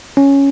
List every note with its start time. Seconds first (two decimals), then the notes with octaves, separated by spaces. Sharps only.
0.17 C#4